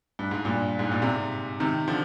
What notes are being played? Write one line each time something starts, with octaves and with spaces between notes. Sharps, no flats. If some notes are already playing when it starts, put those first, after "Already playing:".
G2
G#2
G2 A#2
G#2
A#2
G#2 C3
C3 D#3
D3 F3